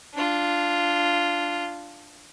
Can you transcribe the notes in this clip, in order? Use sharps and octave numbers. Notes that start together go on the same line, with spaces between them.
D4 F4